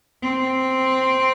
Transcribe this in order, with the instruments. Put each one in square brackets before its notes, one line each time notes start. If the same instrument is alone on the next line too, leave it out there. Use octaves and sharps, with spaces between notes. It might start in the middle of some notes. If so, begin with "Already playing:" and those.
[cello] C4